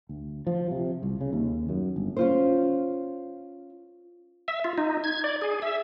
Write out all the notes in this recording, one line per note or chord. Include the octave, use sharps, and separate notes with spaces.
D2
F3
C3
C2
C#3
D#2
F#2
G1
C#4 F4 C5
E5
F4
D#4
G#6
D5
G#4
E5